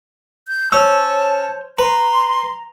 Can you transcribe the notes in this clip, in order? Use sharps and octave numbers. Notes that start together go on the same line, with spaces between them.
G6
C#4 C5 C#5 A5 E6
B4 A#5 C6